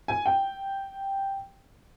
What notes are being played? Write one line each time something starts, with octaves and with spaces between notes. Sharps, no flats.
G#5
G5